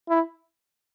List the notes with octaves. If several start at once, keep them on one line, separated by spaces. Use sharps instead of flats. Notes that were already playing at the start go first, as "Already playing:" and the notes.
E4